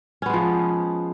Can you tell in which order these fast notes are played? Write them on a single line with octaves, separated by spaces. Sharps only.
C#4 B3 G#3 F3